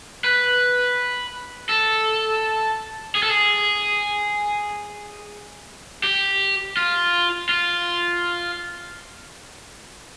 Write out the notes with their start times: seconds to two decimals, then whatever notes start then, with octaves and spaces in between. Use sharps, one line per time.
0.24 B4
1.69 A4
3.15 G#4
3.23 A4
3.30 G#4
6.04 G4
6.77 F4
7.49 F4